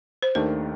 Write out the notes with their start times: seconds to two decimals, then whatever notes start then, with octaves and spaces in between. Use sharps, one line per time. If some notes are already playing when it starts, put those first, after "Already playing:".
0.22 C5
0.35 D#2 D#3 A3 D4 G4 A#4